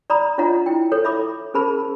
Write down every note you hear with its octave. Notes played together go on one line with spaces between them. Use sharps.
D5 A#5 B5 D#6
D4 F4 C#5 D#5 F#5 A#5
E4 G5
A4 C#5
C#5 E5 B5 D6 D#6
C#4 G#4 A#4 C5 A5 B5